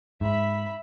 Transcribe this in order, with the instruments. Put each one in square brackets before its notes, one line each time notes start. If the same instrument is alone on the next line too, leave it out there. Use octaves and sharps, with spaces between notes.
[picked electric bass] G#2 [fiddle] E5 B5